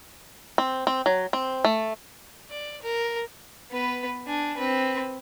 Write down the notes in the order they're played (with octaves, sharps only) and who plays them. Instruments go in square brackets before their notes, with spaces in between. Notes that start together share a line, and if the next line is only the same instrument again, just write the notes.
[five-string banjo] C4
C4
F#3
C4
A3
[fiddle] D5
A#4
B3 B4
D4 G#5
C4 B4